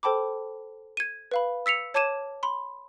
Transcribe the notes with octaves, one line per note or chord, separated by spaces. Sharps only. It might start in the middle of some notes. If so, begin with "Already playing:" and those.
A4 C5 G5 A5 B5 D6
G#6 D#7
B4 F5 B5
E6 B6 C#7 F7
C#5 A5 D6 G#6 D#7 E7
B5 C6